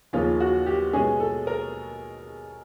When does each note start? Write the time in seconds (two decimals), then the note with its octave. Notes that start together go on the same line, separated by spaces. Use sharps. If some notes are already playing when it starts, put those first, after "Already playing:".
0.13 D#2 C#3 F3 A#3 C#4 F4
0.40 F#4
0.66 G4
0.93 B2 G#3 C#4 G#4
1.20 A4
1.47 A#4